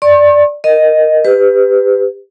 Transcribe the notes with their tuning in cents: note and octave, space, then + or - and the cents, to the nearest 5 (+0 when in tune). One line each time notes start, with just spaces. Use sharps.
D5 +0 C#6 -45
A#4 +0 D#5 +0
G4 +20 B4 +30